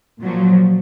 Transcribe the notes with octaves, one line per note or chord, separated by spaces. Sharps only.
A#2 F3 F#3